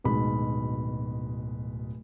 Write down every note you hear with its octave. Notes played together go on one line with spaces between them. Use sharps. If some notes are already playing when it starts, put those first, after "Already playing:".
D1 B2 D#3 G#3 B5